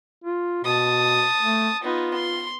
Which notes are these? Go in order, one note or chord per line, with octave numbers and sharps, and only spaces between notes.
F4
B2 A5 D#6
A3
B3 D#4 F4
C6